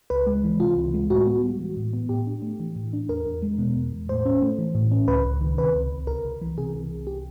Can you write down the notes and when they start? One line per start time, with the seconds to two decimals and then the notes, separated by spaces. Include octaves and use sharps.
0.10 C#2 B4
0.27 G#3
0.44 E3
0.60 C3 F4
0.77 C#2
0.94 G#3
1.09 A2 F#4
1.26 B3
1.43 G3
1.59 E3
1.77 A2
1.93 B3
2.09 A2 G4
2.27 D4
2.42 A3
2.60 E3
2.76 A2
2.93 D4
3.09 E2 A#4
3.26 E2
3.42 G#3
3.59 B2
3.76 E2
3.92 E2
4.09 A2 C5
4.25 C#4
4.42 A3
4.59 E3
4.75 A2
4.92 C#4
5.08 C#2 B4
5.25 C#2
5.41 D#3
5.58 C3 B4
5.75 C#2
5.92 C#2
6.07 C2 A#4
6.25 C2
6.42 E3
6.58 C3 G#4
6.74 C2
6.91 C2
7.07 G4